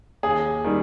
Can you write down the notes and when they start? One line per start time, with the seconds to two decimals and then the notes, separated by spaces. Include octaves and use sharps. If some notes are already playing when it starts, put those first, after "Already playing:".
0.23 D#2 G#4
0.64 D#3 G3